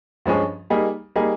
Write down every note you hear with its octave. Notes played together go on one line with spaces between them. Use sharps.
G2 F3 G#3 C#4 G#4
G3 A#3 D#4 G#4
G3 A#3 D#4 G#4